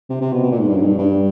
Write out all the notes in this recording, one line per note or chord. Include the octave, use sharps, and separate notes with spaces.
C3
C3
B2
B2
A#2
G#2
G2
F#2
G#2
G2
G2